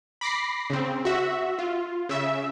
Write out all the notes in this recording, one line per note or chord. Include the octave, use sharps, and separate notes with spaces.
B5 D6 A#6 C7
C#3 C4
F#4 E5
F4
C#3 E5